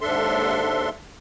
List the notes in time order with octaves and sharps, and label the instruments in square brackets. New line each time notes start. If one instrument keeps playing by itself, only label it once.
[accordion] D#2 G#2 D4 A4 E5 C6